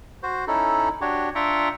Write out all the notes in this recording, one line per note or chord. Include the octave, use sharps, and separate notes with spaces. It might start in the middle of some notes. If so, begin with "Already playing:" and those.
F#4 C5
C#4 D#4 E4 A4
D4 F#4 G4 C#5
D4 F4 E5 G5 A#5 C#6